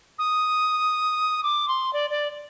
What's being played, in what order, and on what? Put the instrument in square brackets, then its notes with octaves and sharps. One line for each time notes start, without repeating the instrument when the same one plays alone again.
[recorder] D#6
D6
C6
D5
D5